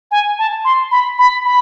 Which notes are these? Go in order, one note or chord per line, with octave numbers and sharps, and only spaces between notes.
G#5
A5
C6
B5
B5
B5